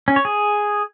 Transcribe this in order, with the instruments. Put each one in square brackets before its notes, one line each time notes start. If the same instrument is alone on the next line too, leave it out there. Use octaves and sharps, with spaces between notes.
[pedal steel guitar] C#4
C#5
G#4